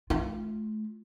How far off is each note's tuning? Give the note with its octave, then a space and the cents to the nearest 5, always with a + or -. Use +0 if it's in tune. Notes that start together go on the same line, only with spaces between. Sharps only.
A3 -35 F4 +0